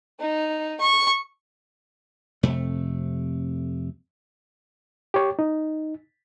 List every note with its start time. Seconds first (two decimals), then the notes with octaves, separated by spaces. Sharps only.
0.20 D#4
0.81 C#6
2.43 F2 C3 A3
5.14 G4 C#5
5.39 D#4